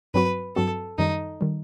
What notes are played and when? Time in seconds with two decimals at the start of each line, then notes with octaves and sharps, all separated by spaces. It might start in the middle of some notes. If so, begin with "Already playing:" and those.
0.14 G2 F#3 C4 F#4 B4
0.56 G2 F#3 C4 F#4 A4
0.98 F#2 D#3 G3 D#4
1.41 D#3 G3